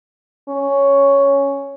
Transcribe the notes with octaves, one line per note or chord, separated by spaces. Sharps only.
C#4